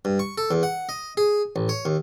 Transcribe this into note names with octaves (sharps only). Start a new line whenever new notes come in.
G2
C#6
A4
E2
F#5
D#5
G#4
A1
C#5
D#2